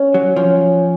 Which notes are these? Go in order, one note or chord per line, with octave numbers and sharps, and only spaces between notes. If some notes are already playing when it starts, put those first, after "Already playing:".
Already playing: C#4
F#3
F3 C#4